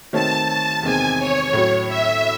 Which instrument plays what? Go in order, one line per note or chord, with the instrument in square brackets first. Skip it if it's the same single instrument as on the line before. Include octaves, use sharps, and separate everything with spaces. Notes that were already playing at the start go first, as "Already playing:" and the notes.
[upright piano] D#3 A3 C4 F#4 C#5 [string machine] A5
[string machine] A5
[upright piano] E2 C3 D#3 G#3 C4 [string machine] G#5
[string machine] C#5
[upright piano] A2 F#3 C#4 F#4
[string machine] E5